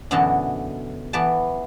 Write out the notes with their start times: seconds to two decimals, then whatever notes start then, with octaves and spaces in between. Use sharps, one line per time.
0.11 F#2 B2 D3 E3 D#5 A5
1.13 E3 B3 D5 A5